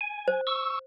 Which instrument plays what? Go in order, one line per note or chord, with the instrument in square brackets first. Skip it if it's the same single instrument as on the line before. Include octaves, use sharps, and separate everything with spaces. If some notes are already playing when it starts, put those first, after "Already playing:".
[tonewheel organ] G#5
[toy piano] C5
[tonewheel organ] C#6 E6